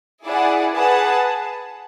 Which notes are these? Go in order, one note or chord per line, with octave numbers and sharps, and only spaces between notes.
E4 G#4 D5 F#5
G#4 B4 F#5 A5